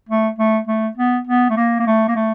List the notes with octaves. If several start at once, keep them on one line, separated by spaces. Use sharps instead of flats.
A3
A3
A3
B3
B3
A3
A#3
A#3
A3
A#3
A3